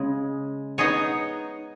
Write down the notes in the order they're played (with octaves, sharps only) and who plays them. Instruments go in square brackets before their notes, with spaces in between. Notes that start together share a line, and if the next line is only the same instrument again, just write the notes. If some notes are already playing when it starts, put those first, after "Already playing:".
Already playing: [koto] C#3 G#3
B3 D#4 G#4 C#5